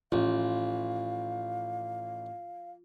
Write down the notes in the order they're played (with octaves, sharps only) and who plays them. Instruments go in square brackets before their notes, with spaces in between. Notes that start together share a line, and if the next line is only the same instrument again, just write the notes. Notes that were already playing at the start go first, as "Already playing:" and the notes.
[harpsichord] A1 [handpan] F4 [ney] F5